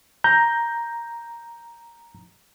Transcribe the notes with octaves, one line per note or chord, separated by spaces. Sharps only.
A#5 G6